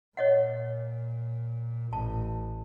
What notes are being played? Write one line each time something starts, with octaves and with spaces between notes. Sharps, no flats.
A#2 C#5 D#5 F#5
A1 A5